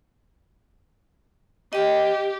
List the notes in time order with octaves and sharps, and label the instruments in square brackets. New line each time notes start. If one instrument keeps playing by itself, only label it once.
[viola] G4 [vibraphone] D#5 G5